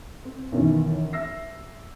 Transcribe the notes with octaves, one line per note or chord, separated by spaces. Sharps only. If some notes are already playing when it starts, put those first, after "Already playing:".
C4
B1 F#2 D#3 E3
E5 E6 A#6 C7